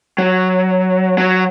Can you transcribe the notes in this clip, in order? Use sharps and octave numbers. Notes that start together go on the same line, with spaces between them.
F#3
F#3